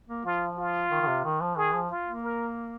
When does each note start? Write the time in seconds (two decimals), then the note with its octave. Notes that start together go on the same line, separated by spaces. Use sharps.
0.08 A#3
0.25 F3 F4
0.57 F4
0.91 D#3
1.01 D#3
1.08 C3
1.24 D#3
1.41 F3
1.57 D#3 G#4
1.74 F3
1.90 F4
2.06 A#3
2.24 A#4